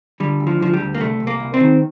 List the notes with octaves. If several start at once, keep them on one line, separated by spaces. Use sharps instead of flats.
D3 G3
D2
F3
D3 F3
G3
D2
A#3
C2 A3
C2
A#3
C2
C4
D#3